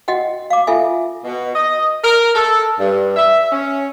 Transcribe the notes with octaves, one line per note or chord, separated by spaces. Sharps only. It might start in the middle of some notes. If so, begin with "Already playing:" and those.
F#4 D#5 F#5 G5
F5 D6
F4 A4 E5 G#5
B2
D#5
A#4
A4
G2
E5
C#4